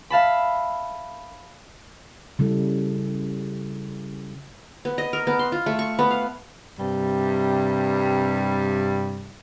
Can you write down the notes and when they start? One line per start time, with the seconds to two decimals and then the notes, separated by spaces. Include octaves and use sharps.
0.10 E5 F5 A5 B5
2.39 C#3 G3 E4 A4
4.85 B3
4.98 D#5
5.13 A#4
5.27 B3
5.39 C6
5.52 F4
5.66 A3
5.79 C#6
5.99 B3
6.11 F5
6.79 G2 C3 G3